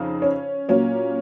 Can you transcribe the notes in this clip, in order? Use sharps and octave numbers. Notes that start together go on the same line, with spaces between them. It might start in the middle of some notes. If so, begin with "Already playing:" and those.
Already playing: F2 C#3 D#4
C#4
A#2 F#3 A#3 C#4